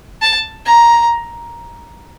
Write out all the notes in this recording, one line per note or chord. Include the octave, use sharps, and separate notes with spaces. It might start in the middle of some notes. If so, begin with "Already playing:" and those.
A5
A#5